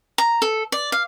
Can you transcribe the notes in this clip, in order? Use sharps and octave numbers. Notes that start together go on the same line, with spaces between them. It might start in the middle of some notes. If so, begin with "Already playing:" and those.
A#5
A4
D5
F5